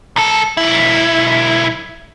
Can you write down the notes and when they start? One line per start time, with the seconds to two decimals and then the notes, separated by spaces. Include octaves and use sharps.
0.16 C2 A4
0.57 B1 E4